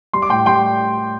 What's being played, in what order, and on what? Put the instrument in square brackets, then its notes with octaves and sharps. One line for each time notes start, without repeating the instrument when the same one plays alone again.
[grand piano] G3 C6
D6
A2 G5 C6
G3 G5 C6